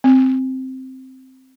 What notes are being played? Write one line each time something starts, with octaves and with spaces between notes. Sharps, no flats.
C4